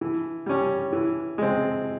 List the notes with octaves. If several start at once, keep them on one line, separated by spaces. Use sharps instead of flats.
E3
G3 C#4
E3
G#3 C4